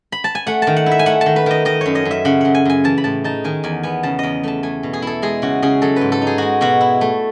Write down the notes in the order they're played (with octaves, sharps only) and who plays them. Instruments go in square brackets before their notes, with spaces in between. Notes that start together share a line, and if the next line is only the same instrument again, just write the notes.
[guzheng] B5
A5
G#5
A3 F#5
D#3 A5
F#5
E4
E5
G#5
A3 F#5
A5
D#3
B4
D#3 D#5
D#3 D#5
F#2 C#5
D#5
F#2
E5
C#3 F#5
F#2 F#5
G#5
F#2 G#5
E3 A5
B5
A2 A5
D#4 A5
D#3 G#5
E2 G#5
B3 G#5
C#3 A5
E2 D#5
A3 A5
A3 G#5
B2
G#4
E4 A4
G#3 G#4
C#3 F#4
C#3 G#4
F#3 A4
G#2 B4
A4
D#4
G#4
G#3 F#4
B2 F#4
E4
A3